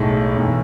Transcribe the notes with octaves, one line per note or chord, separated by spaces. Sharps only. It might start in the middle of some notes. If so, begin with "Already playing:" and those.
Already playing: B1 A2 G#3 D#4
B1 A2 E3